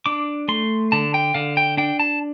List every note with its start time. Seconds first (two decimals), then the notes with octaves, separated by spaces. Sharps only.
0.06 D4 D6
0.48 A3 C6
0.92 D3 A5
1.14 G5
1.34 D3 F5
1.57 G5
1.77 D4 G5
1.99 A5